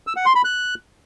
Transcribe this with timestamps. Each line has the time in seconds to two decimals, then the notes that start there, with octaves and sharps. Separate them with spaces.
0.07 E6
0.16 F#5
0.26 C6
0.35 B5
0.45 F#6